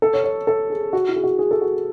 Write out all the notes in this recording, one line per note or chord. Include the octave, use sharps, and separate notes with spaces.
A4
C#5
C#5
A4
G#4
F#4
E4
G#4
F#4
G#4
A4
F#4